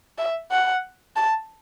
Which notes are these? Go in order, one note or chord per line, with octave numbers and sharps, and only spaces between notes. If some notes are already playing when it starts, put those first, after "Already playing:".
E5
F#5
A5